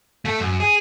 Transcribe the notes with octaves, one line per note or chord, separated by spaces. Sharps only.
A3 A4
F#2
G#4